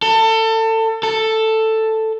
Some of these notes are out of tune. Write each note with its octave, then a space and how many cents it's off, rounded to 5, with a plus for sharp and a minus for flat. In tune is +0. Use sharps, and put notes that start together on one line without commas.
A4 +25
A4 +5